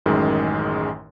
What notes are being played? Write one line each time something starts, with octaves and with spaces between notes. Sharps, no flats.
A1 F#2 D#3 G#3